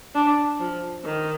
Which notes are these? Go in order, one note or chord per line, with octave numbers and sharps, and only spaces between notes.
D4
F3
D#3